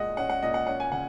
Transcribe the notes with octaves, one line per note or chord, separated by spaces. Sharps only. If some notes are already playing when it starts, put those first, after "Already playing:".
Already playing: A#2 G#3 D#5 F#5
C#4 F#5
F#5
A#2 D#5
F#5
C#4 F#5
G#5
C#3 F#5